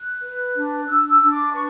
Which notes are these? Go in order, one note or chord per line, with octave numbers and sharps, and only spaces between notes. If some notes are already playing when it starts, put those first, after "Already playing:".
Already playing: F#6
B4
D4
D4 E6
E6
D4
D6
B4 C#6